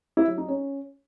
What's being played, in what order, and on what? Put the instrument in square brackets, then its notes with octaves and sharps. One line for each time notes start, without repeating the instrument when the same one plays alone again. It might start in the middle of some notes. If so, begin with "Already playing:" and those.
[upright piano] E4
F#3
D#4
C#4